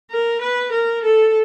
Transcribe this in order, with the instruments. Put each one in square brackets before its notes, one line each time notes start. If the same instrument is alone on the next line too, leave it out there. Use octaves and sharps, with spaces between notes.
[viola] A#4
B4
A#4
A4